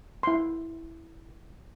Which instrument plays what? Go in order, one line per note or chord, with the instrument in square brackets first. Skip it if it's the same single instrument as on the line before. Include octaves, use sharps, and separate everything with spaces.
[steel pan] E4 C6